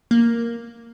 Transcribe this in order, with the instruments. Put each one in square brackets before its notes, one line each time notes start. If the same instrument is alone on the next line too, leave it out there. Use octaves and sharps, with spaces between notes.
[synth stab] A#3